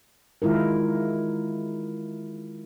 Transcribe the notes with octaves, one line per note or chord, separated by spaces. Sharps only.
D#3 G#3 E4 F4 A#4